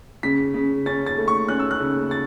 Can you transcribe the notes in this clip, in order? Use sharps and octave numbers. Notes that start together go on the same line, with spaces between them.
C#3 B6
C#3
C#4 A6
A6
A3
C#6
C#4 F#6
E6
F#6
C#3
A6